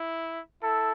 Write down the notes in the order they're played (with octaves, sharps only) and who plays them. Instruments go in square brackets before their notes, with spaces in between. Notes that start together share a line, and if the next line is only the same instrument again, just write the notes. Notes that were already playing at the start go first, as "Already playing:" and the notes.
Already playing: [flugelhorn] E4
[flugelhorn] E4 [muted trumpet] A4